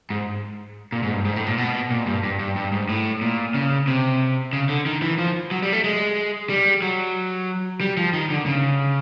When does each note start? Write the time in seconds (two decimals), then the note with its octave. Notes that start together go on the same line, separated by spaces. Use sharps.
0.10 G#2
0.92 A#2
1.03 G#2
1.14 G2
1.25 G#2
1.36 A2
1.47 A#2
1.58 B2
1.91 A#2
2.07 G2
2.24 G2
2.39 G2
2.56 G2
2.72 G#2
2.89 A2
3.22 A#2
3.54 C#3
3.87 C3
4.53 C#3
4.69 D3
4.86 D#3
5.02 E3
5.18 F3
5.51 F#3
5.62 G3
5.73 A3
5.84 G#3
6.50 G3
6.82 F#3
7.81 G3
7.97 F3
8.13 D#3
8.30 D3
8.46 C#3